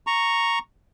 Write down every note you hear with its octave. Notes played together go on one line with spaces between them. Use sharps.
A#5 C#6